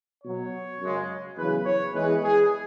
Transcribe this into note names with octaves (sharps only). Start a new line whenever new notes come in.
B2 F#3 C#5
F#2 C#3 G#3
E2 C#3 F#3 B4
C#5
E2 E3 G#3 B4
G#4